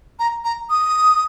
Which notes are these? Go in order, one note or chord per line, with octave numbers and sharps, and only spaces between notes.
A#5
A#5
D#6